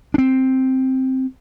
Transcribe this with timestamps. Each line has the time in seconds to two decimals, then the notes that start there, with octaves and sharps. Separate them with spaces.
0.14 C4 D4